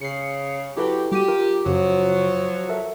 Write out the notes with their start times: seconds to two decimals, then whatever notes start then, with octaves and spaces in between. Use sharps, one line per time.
0.01 C#3 C7 C#7
0.77 F#3 E4 G4 A4 B4
1.12 G3 F#4 G4 D#7
1.28 F4 A#4
1.66 F#2 C#3 F3 F#3
2.69 A4 A#4 E5